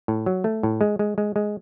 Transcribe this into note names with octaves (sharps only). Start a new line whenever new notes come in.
A2
F#3
A3
A2
G#3
G#3
G#3
G#3